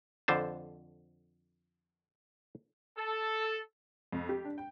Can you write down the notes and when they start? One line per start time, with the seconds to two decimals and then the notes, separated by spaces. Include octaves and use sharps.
0.28 F2 D3 C5 A5
2.98 A4
4.13 F2
4.29 G4
4.45 D4
4.58 G5